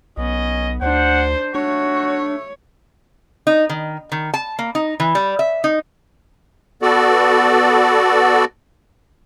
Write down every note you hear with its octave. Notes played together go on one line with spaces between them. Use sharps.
B1 B3 C#4 D#5
D2 D4 C5 F#5
A3 D4 F#4 C#5
D#4
D#3
D#3
A5
A#3
D#4
E3
G3
E5
D#4
B3 F#4 A4 D5